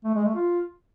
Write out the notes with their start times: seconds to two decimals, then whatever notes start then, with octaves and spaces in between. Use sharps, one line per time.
0.04 A3
0.15 G#3
0.25 A3
0.35 F4